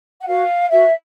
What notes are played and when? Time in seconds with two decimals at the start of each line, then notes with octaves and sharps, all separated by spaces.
0.21 F#5
0.26 F#4 A#4 C#5 F5
0.69 F#4 A#4 C#5 E5